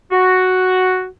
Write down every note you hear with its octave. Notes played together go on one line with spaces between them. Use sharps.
F#4